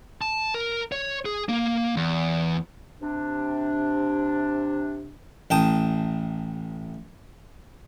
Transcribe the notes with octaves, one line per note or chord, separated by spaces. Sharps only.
A5
A#4
C#5
G#4
A#3
E2
C3 D4
A1 G5 A5 D#6